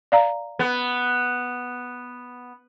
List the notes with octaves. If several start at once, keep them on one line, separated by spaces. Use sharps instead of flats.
D5 F5 A#5
B3